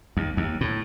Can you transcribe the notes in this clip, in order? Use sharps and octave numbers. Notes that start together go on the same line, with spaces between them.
D#2
D#2
A2